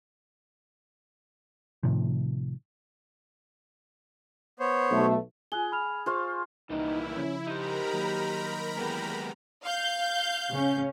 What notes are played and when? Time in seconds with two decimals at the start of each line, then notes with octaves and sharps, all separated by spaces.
1.83 A2 C3 D#3 F3
4.60 B3 C5 C#5
4.91 B1 A3
5.52 F4 G#4 F#6 G7
5.72 B5 F6 F7
6.06 F4 G#4 C5 F5 C#6
6.70 C2 A#2 D#3 E3 D#4 E4
7.16 C#3 F3 C#4
7.47 D#4 G4 A#4 C5 A#5 B5
7.93 D#3 F#3 A#3
8.77 E2 G#3 B3 G4
9.63 F5 G6
10.51 C#3 C#4